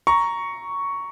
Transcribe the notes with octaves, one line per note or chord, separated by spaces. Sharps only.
A#5 C#6